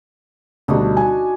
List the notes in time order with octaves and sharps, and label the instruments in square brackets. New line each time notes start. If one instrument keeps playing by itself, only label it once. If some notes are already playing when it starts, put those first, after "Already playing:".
[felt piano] D2 B2 G3 [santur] D4 D#4 F#4
[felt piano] G#5